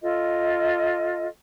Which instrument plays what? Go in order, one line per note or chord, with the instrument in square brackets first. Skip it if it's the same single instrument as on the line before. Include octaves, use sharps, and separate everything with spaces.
[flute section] F4 A4 D#5